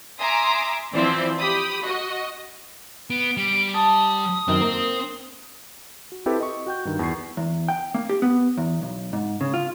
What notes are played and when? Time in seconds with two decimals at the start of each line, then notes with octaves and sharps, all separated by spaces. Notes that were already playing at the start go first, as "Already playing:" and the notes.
0.19 E5 G#5 A#5 C6 D6 D#6
0.94 E3 F3 C4 E4 C5 D5
1.38 G4 B5 D#6
1.83 F#4 D#5
3.10 B3 D7
3.37 G3 D7
3.74 A5 D#6
4.48 F#2 D#3 C4
4.61 A#3
6.12 F#4
6.26 C4 E4 G4 A4 B4
6.40 D#5 C#6
6.66 F#4 G5 G6
6.85 G2 D#3
6.99 E2 C#6 C7
7.37 E2
7.68 G5
7.94 A#3
8.09 G4
8.22 B3
8.58 E2
8.82 B1
9.13 G#2
9.41 C#3
9.54 F4